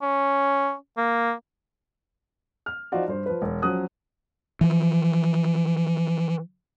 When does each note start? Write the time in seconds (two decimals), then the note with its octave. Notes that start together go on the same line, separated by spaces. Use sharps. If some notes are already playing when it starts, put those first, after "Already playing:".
0.02 C#4
0.97 A#3
2.66 F6
2.92 F3 D#4 F4 F#4 D5
3.08 G2 C5
3.26 F3 B4
3.42 E1
3.62 F3 F#3 C#4 D#6 F#6
4.61 E3 F3